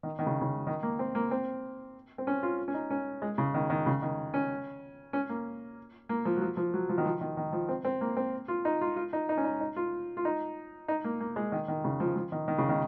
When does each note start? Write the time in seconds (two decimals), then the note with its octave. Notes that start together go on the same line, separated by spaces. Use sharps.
0.03 D#3
0.19 D#3
0.26 C#3
0.41 C#3
0.67 D#3
0.83 A#3
0.99 C4
1.15 A#3
1.31 C4
2.18 C4
2.27 C#4
2.43 F4
2.68 C#4
2.74 D#4
2.90 C#4
3.22 G#3
3.38 C#3
3.54 D#3
3.70 D#3
3.86 C#3
4.02 D#3
4.34 C#4
5.13 C#4
5.29 A#3
6.09 A#3
6.25 F3
6.37 F#3
6.42 F3
6.57 F3
6.74 F#3
6.89 F3
6.98 D#3
7.05 F3
7.21 D#3
7.37 D#3
7.53 F3
7.69 C4
7.85 C4
8.01 A#3
8.17 C4
8.48 F4
8.65 D#4
8.81 F4
8.96 F4
9.13 D#4
9.29 D#4
9.37 C#4
9.44 D#4
9.60 D#4
9.76 F4
10.17 F4
10.25 D#4
10.88 D#4
11.04 A#3
11.20 A#3
11.36 G#3
11.52 D#3
11.68 D#3
11.84 C#3
12.00 F3
12.16 F3
12.32 D#3
12.48 D#3
12.58 C#3
12.69 D#3